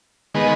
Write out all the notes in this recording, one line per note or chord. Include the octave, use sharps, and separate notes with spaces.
D#3 G#3 B3